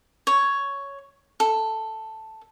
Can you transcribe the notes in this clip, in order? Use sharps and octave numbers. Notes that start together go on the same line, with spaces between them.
C#5
A4